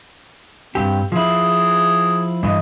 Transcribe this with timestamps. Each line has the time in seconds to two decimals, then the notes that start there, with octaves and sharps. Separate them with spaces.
0.75 G2 C4 G4
1.12 F3 E4 G#4
2.43 G2 E3 D#5